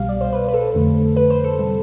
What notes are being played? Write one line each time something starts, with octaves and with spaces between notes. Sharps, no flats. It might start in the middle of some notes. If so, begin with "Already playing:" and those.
Already playing: C2 B2 G3 F5
D5
C5
B4
B4
A4
F2 D3 A3
B4
C5
A4
C3 G3